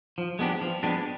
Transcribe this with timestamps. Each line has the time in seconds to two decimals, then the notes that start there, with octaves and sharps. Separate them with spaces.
0.18 F3
0.39 G#3 B3 D4 G4
0.61 F3
0.83 G#3 B3 D4 G4